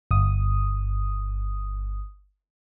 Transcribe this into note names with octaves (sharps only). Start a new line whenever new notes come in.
G1 D#6